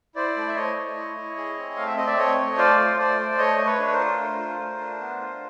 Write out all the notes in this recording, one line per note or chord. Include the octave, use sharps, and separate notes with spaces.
E4 C5 D5
A3
E5
A3 C#5 D#5
A3
E4
E4
G#4
C4
A3 F5
E5
C4 D#5
D5 E5
A3 C#5 D#5
A3
F4 C5 D5
A3
A3 C5 D5
A3
A3 C#5 D#5
A3
B4 C#5
D4
A#4 C5
F4
A3
F4
A3
D4
B3
F4